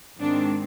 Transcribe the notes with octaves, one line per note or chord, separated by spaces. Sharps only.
G#2 D#3 G#3 C4 D4